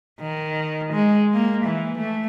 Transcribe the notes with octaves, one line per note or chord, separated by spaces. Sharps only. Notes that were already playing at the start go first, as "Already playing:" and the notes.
D#3
G#3
A#3
E3
A3